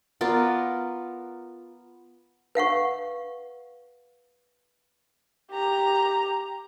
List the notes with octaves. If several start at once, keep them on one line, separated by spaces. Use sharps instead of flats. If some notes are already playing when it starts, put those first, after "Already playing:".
B3 F4 A#4 D5
B4 F5 F#5 C#6
G4 A#5